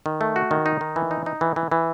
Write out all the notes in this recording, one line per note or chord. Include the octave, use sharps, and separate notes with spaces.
D#3
A3
F#4
D#3
D#4
D#3
E3
D#4
D#4
E3
E3
E3